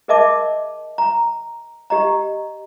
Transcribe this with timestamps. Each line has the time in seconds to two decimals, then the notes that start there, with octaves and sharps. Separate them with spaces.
0.08 G#4 A#4 D#5 E5 A5 D6
0.98 A#5
1.90 G4 D#5 A#5